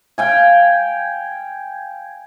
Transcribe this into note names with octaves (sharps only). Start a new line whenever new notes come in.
F5 G5 G#5